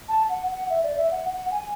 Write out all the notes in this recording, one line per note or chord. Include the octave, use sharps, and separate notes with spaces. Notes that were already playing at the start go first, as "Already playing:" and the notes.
A5
F#5
F#5
E5
D5
E5
F#5
F#5
G#5